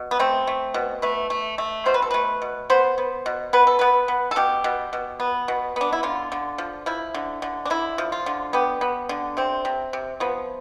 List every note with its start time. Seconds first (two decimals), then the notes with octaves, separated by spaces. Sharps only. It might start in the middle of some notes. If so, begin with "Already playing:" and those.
Already playing: B2
0.11 B3
0.19 A3 C4
0.47 A3
0.74 B2
1.02 A3 B4
1.30 A3
1.58 A3
1.86 B2 C5
1.94 B4
2.02 A4
2.11 A3 B4
2.42 B2
2.70 B3 C5
2.98 B3
3.26 B2
3.53 B3 B4
3.67 A4
3.79 B3 B4
4.08 B3
4.31 A4
4.36 B2 G4
4.64 B2
4.93 B2
5.20 B3
5.48 B2
5.76 B3 D4
5.93 E4
6.03 D3 F4
6.32 D3
6.58 F3
6.86 F3 E4
7.14 D3
7.42 D3
7.65 D4
7.70 D3 E4
7.98 F3
8.12 F4
8.26 D3
8.53 B3 G4
8.81 B3
9.09 D3
9.37 C3 C4
9.65 C3
9.93 C3
10.20 F3 B3